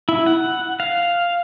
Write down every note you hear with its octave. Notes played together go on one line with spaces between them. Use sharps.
E4
F#5
F5